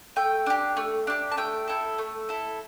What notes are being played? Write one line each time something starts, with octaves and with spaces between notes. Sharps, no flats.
A3 G5
D4 G4
A3
D4 G4
A5
A3 G5
E4 A4
A3
E4 A4